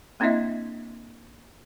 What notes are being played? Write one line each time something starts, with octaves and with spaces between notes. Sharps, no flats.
A#3 C4 D4 E4 D#5 E5